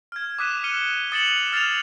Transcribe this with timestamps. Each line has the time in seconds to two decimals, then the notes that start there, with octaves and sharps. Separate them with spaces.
0.12 F6 G#6
0.39 D6 D#6 F#6 B6 D#7 E7
0.63 F6 C#7 D#7 G7
1.12 D#6 A6 C#7 E7 F#7
1.52 F6 A6 C7 E7 F7